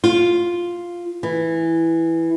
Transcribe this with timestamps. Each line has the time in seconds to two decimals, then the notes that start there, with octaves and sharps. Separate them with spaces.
0.04 F4
1.23 E3